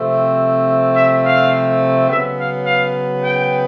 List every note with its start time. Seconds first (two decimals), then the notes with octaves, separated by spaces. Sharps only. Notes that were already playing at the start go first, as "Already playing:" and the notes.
Already playing: C3 F3 A3 C4
0.95 E5
1.24 F5
2.09 C#3 F#3 B3 E5
2.38 F5
2.66 F5
3.23 G5